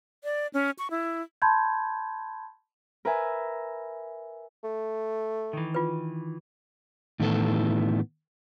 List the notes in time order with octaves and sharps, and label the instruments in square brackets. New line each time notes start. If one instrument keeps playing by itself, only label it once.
[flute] D5
C#4
C#6
E4
[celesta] A5 B5 C6 G6 G#6
[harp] A#4 B4 E5 G#5
[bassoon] A3
[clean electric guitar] D#3 E3
[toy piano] F4 B4
[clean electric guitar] A2 D#3 E3 B3 A4